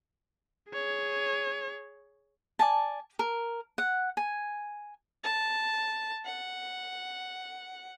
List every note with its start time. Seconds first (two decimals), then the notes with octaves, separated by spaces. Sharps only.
0.71 G#4 C#5
2.59 D5 G#5 A5
3.19 A#4
3.78 F#5
4.17 G#5
5.24 A5
6.25 F#5